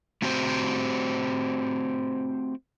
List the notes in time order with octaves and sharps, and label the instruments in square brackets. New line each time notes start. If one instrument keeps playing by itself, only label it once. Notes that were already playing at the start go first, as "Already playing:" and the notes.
[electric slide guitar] A3 C4 F#4 G4 C5